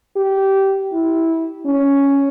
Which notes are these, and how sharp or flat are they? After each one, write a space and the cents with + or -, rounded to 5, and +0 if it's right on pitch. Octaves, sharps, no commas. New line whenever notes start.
G4 -15
E4 -15
C#4 +5